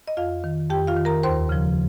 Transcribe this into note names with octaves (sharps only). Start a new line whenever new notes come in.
D#5
F2 F4 F5
D#3
F2 G4 G5
F4 F5
D#3
A#4 A#5
D#2 C5 C6
C#3 F3